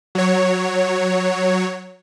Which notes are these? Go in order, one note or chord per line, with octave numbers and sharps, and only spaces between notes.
F#3 C#5